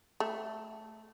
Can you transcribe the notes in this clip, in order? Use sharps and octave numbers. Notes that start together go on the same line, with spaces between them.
A3